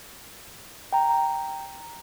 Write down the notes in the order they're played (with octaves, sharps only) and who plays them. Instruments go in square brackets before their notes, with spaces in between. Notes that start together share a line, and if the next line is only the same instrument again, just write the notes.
[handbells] G5 A#5